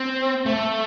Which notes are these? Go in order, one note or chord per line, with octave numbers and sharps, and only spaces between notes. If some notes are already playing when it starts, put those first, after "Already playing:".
Already playing: C4
A3